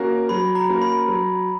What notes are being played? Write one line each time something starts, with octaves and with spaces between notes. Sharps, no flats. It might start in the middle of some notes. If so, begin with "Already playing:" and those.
Already playing: A#3 C#4 F#4 A#4
F#3 B5
A#5
A#3 C#4 F#4 A#4
B5
F#3